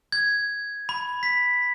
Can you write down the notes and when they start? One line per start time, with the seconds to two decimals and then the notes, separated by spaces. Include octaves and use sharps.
0.12 G#6
0.89 B5
1.23 B6